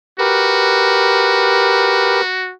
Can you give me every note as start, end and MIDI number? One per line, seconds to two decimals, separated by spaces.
0.19 2.52 66
0.19 2.21 67
0.19 2.21 70
0.19 2.21 71